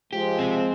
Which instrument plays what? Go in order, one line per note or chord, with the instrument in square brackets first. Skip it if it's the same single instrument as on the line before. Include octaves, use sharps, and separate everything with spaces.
[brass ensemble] F3 G#3 [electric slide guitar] G4
[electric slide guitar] C4